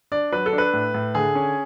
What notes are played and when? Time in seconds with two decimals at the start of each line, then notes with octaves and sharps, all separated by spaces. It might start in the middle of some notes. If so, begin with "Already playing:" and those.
0.12 D4 D5
0.32 F#3 B4
0.46 A4
0.53 D4
0.58 B4
0.73 A2
0.94 A2
1.15 D3 G#4
1.35 C#4